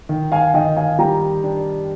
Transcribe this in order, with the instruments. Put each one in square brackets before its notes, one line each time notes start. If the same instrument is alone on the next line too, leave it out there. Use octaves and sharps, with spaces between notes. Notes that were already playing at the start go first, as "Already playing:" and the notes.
[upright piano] D#3
[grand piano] F5 G#5
[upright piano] D#3 [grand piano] D#5 G5
[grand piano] F5 G#5
[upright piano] G3 [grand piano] G5 A#5
[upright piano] D4